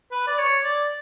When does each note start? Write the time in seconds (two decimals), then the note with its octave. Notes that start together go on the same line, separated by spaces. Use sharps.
0.12 B4
0.27 D5
0.38 C#5
0.64 D5